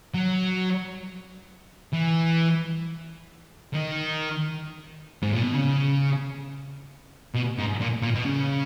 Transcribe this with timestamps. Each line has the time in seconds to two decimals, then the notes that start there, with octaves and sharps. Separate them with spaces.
0.14 F#3
1.93 E3
3.74 D#3
5.22 G#2
5.33 A#2
5.44 B2
5.55 C#3
7.34 B2
7.58 G#2
7.81 A#2
8.02 A#2
8.15 B2
8.25 C#3